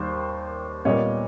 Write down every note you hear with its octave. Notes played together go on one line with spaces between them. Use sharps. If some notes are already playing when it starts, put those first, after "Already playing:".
Already playing: D#2 D#3 G3 C5
A#2 G3 B3 C#5 D#5